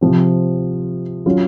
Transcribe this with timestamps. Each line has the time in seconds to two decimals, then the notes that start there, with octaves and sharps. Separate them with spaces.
0.01 C3 F3 C4
1.26 F#3 C#4 F4